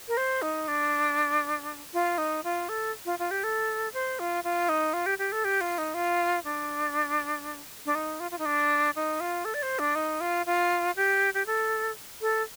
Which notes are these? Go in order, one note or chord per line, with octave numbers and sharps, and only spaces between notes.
A#4
C5
D#4
D4
F4
D#4
F4
A4
F4
F4
G4
A4
C5
F4
F4
D#4
F4
G4
G4
A4
G4
F4
D#4
F4
D4
D4
D#4
F4
F4
D#4
D4
D#4
F4
A4
D5
C5
D4
D#4
F4
F4
G4
G4
A4
A4